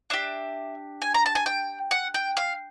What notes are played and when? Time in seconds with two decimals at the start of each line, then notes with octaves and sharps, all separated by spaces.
0.10 D4 G4 E5
1.02 G#5
1.14 A#5
1.26 A5
1.35 G#5
1.46 G5
1.91 F#5
2.14 G5
2.37 F5